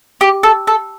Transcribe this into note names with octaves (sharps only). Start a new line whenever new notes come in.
G4
A4
A4